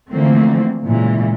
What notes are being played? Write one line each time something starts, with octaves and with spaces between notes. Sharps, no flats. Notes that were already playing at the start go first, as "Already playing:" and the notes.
D3 E3 F3 A3 A#3 C4
A#2 C#3 E3 G#3